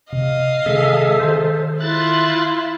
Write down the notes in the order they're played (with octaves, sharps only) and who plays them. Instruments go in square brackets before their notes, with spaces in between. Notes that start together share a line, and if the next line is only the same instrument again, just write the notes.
[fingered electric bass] C3 [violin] D#5 F5
[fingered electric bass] C3 D#3 G#3 [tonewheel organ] G#4 A4 E5
[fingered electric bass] D#3 [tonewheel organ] A4 C5
[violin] E4 F4 [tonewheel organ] F#6 A6